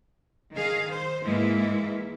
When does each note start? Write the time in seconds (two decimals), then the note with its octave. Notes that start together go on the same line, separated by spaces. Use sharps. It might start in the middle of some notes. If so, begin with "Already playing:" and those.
0.53 D#3 G#4 F5
0.90 C5
1.24 G#2 E3 G#3 A#3 E4